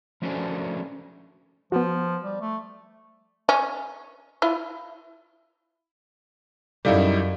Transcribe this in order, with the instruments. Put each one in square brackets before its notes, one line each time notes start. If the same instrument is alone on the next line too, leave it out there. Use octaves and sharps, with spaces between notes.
[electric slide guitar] F3 A3 C#4 D4 F#4 C5
[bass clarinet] F3 [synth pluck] B3 F#4
[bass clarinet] G3
A3
[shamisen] C#4
E4 F4
[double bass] F#2 [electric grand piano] G3 D#4 E4 [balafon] A4 D5 F5